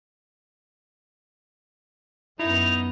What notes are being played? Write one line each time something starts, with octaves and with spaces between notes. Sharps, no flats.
F#2 B3 D#4 E4 F7